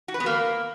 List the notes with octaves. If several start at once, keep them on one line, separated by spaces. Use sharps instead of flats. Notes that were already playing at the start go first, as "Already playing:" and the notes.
F#4
B4
B3
A#3